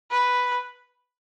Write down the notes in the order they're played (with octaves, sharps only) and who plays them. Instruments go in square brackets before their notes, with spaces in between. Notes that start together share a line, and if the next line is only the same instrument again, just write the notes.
[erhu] B4